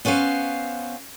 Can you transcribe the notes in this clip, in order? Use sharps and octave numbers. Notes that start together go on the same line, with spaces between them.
B3 C#4 B4 C5 F5